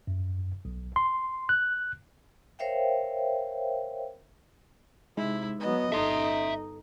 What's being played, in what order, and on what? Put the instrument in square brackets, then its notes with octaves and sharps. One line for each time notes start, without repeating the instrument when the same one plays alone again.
[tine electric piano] F#2
B1
C6
F#6
[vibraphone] A#4 C5 C#5 E5 F5 G5
[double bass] C3 [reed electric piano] G#3 D#4 [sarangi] E4
[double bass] F#3 B3 [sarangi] D#5
[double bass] G1 D#4 [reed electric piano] A4 [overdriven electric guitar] E5 C6